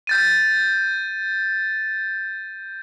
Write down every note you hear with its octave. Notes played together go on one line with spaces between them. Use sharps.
G6 A6 D#7